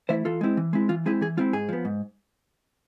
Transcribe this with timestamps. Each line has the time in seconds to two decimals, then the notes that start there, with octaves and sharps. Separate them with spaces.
0.09 E3 A3 E4 C5 E5
0.25 E3 F4 A4
0.41 G#3 C4 E4
0.57 E3
0.73 G#3 C4 E4
0.89 E3 F4
1.06 G#3 C4 E4 G#4
1.21 E3 G#4
1.37 G#3 C4 E4 F4
1.53 G#2 G#4
1.69 F3 B3
1.85 G#2